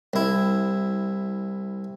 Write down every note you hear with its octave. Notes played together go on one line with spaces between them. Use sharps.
C2 E4